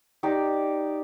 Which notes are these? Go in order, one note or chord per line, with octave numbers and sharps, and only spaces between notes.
D#4 G4 D5